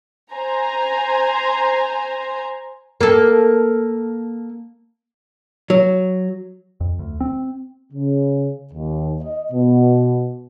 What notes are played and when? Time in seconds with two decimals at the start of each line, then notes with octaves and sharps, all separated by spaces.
0.33 C5 G#5 A#5
3.01 A#3 A4
5.70 F#3
6.81 F2
6.99 D2
7.21 C4
7.93 C#3
8.74 D#2
9.22 D#5
9.53 B2